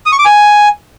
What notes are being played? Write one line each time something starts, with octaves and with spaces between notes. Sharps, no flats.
D#6
C#6
D6
G#5